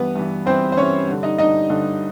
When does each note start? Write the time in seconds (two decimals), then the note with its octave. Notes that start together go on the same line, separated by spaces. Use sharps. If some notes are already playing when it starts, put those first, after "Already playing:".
Already playing: G2 E3 B3 B4
0.15 G2 E3
0.46 G2 E3 C4 C5
0.72 C5
0.77 G2 E3 C#4 C#5
1.08 G2 D3
1.23 D#4 D#5
1.38 G2 D3 D#4 D#5
1.70 G2 D3